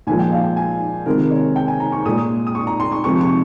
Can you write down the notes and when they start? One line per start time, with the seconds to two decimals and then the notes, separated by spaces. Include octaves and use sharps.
0.07 A#2 F3 G#3 G#5
0.19 G5
0.32 F5
0.44 G5
0.57 G#5
1.06 C3 D#3 G#3 A#4
1.30 C#5
1.56 G5
1.68 G#5
1.80 A#5
1.92 C#6
2.06 A#2 G#3 D#6
2.47 D#6
2.55 C#6
2.67 A#5
2.80 C6
2.92 C#6
3.04 C3 F3 G#3 C#6
3.21 C#6